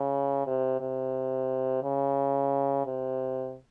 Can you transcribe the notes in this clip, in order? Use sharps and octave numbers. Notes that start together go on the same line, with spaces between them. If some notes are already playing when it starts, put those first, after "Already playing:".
Already playing: C#3
C3
C3
C#3
C3